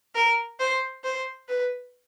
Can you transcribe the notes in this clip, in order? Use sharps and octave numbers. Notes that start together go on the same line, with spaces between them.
A#4
C5
C5
B4